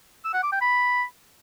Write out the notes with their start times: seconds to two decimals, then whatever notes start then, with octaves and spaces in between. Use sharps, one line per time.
0.24 E6
0.34 F#5
0.43 D6
0.52 G5
0.61 B5